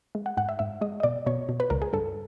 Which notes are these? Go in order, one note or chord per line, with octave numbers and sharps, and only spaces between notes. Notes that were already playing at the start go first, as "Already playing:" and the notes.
G#3
F#5
G#2 F#5
E5
G#2 E5
G#3 D#5
D#5
B2 D5
B2 C#5
B2
B4
C#2 A#4
G#4
G2 A4